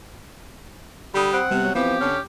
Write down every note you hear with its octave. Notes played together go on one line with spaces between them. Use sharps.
D3 G3 B5 D#6
C4 F#5
C3 G3 B3
F#3
E3 F3 B3 C4 G4
D3 C#4